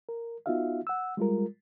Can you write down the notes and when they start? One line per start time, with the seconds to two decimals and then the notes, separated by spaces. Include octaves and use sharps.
0.09 A#4
0.46 B3 D#4 F4 F#4 E5 F5
0.87 F#5 E6
1.17 G3 G#3 F4 A#4